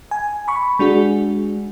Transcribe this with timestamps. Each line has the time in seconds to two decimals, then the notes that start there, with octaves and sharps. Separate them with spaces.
0.11 G#5
0.48 B5 C#6
0.79 G#3 D4 F#4 G#4